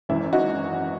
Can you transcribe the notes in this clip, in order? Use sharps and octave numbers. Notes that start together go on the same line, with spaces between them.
G#1 F#2 E3 E4
D#4 F#4